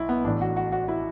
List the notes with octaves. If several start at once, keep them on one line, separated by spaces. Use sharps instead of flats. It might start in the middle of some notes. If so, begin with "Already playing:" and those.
Already playing: B1 E4
B3
A1 A2 E3 D4
F#4
F#4
F#4
E4